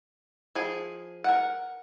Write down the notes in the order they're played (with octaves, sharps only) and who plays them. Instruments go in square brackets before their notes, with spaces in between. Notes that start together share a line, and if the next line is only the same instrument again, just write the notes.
[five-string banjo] F3 G#4
A#4 F#5